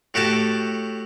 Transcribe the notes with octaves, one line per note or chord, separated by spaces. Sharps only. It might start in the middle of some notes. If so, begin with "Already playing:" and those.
A2 F#4 G4 A4 A5